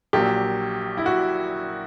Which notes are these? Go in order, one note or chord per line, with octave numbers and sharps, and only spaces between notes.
A#1 A#2 F#3 G4
E4
F#4